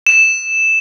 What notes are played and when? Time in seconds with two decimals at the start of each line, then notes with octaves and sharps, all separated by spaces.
0.07 E7